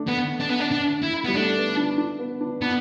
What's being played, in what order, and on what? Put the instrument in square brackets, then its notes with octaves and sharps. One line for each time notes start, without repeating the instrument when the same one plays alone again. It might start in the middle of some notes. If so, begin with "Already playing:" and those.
Already playing: [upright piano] A3 D4
[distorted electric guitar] B3
D4
B3
D4
D4
E4
[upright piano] G3 [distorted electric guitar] B3
[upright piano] A3 [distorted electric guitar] D4
[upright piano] B3
D4
D4
B3
D4
[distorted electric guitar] B3 [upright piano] D4